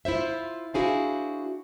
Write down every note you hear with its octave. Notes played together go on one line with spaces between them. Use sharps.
E4 F4 C5 E5
D4 E4 F#4 G#4 C5 F5